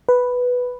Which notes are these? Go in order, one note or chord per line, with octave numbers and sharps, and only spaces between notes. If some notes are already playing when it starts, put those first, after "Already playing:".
B4